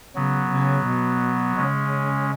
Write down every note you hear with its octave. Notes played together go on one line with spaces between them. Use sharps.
C#3 F#3 B3
C#3
B2
C#3 G#3 C#4